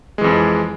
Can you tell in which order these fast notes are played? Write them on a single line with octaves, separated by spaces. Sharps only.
G#3 E3 F2